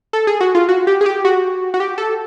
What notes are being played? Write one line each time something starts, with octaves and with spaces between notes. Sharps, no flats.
A4
G#4
F#4
F4
F#4
G4
G#4
G4
F#4
F#4
G4
A4